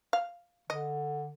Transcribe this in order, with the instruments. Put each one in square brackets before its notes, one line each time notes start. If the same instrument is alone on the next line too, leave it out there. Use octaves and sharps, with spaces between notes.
[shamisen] F5
[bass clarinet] D3 [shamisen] D#5